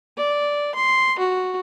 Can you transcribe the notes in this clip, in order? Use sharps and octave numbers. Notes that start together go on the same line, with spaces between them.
D5
C6
F#4